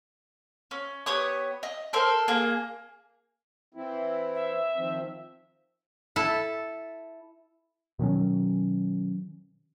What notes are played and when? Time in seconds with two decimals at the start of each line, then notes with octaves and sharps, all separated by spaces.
0.71 C#4
1.06 B3 G4 C#5 D#6
1.63 D#5
1.93 A4 A#4 C5
2.28 A#3 G#4
3.75 E3 C4 E4
4.34 E5
4.75 D#3 F3 C4
6.16 E4 A4 A5
7.99 B2 D#3 F#3 C#4